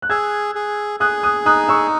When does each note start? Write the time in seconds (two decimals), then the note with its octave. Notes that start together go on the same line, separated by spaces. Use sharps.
0.02 F#6
0.10 G#4 E6 G#6
0.55 G#4
1.00 G#4 D#6 F#6
1.23 D#6 F#6
1.46 D#4 D#6 F#6
1.68 C#6 E6